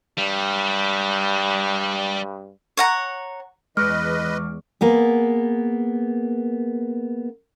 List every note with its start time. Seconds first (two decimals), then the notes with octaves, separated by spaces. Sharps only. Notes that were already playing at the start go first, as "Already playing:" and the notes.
0.18 G2 G3
2.77 C#5 F#5 A#5
3.77 E2 G#3 B4 D#5 C#6 D6 F6
4.81 A#3 B3 G#4